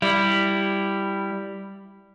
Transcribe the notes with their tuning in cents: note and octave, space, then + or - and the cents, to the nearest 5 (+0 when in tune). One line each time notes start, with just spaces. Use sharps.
G3 +0 E4 +0